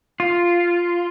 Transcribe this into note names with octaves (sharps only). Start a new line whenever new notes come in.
F4